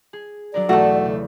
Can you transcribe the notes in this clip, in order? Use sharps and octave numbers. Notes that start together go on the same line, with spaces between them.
G#4
F#3 D4 A#4 D5
B1 E2 A3 F#4 A4
C#3